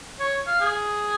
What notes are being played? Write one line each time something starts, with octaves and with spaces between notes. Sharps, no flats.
C#5
F5
G#4